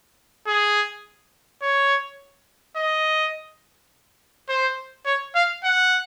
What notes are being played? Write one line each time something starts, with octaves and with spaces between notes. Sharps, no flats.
G#4
C#5
D#5
C5
C#5
F5
F#5